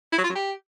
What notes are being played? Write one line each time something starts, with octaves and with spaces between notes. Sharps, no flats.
E4
F#3
F4
F#3
G4